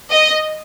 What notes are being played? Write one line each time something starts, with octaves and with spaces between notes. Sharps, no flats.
D#5